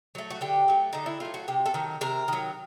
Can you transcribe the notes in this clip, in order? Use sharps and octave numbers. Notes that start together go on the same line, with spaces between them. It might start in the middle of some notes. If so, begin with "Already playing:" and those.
F#3 A3
F#4
D3 G4
F#3 A3
D3 D#4
E4
F#3 A3 F4
F#4
C3 G4
A4
D#3 F#3
C3 A#4
D#3 F#3